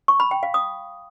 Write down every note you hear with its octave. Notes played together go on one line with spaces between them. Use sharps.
C#6
B5
G5
F5
D#6